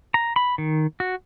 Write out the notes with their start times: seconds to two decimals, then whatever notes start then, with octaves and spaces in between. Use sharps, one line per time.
0.14 A#5
0.36 B5
0.58 D#3
1.00 F#4